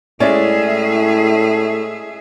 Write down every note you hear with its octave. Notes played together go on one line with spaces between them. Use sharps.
A2 G#3 C#4 E4 G#4 D5 E5